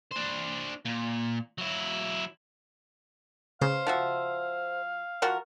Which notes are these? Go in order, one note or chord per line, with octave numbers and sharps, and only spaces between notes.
D4 C5
A#2
F#3 E4
C#3 C5 F5
F3 F#4 E5
F3 F#4 A#4